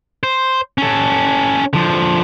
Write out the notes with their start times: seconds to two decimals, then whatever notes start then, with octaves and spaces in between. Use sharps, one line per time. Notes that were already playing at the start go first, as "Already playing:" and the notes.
0.23 C5
0.78 C#4 A4
1.73 D3 F3